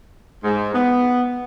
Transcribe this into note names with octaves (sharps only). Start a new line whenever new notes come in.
G#2
B3